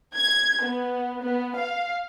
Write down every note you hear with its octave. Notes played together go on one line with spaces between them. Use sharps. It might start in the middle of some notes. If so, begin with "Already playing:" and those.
G#6
B3
B3
F5